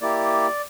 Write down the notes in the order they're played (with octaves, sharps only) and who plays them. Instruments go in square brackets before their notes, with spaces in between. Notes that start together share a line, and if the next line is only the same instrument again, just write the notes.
[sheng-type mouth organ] A#3 E4 G4 D5